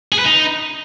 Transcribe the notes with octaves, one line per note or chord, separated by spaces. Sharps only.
G#4
B4
D#4